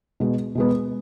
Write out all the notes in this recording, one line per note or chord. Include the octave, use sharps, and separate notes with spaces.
B2 G#3 B3
B2 G#3 B3